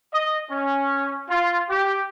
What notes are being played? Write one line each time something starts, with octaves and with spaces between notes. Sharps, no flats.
D#5
C#4
F4
G4